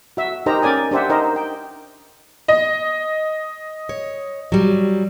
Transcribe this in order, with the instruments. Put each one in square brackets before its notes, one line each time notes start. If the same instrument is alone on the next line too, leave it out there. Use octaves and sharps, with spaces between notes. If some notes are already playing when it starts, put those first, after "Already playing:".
[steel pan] F#4 E5
D#4 G4 A#4 C5 D#5 A#5
C#4 A#4 D5 G#5 D#6
D4 G4 C5 E5 F#5
D#4 A#4 C5 D#5
G5
[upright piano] D#5
[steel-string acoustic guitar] C#5
F#3 G3